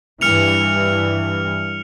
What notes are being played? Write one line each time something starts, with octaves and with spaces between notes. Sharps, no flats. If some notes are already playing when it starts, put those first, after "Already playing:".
G2 E3 F6 C#7 F7